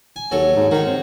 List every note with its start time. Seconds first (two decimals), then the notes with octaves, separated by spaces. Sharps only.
0.16 G#5
0.31 D#2 F#3 A4 C#5
0.56 G#2
0.71 D#3 F#4 C#5
0.86 C4